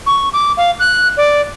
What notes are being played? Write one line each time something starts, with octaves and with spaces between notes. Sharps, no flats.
C#6
D6
F5
F#6
D5